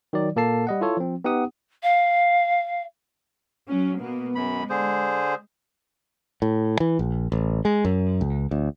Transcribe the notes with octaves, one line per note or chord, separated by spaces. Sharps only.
D#3 F#3 D5
A#2 A#3 A4 A5 C7
G3 D#5 F#5
E4 F4 A4 C#5
F3 C4
B3 D#4 G4 F#5 D#6
F5
F#3 C#4
B2 A#3 B3
F#2 G#3 B5
D3 G#4 C5
A2
E3
A#1
A1
G#3
F#2
C#2
D2